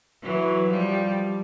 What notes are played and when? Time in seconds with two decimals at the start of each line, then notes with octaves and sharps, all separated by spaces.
0.24 E3 F#3
0.69 F3 G3